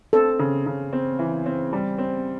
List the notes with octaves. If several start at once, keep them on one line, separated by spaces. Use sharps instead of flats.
C4 A4
C#3
C#3
C4
E3
C4
G3
C4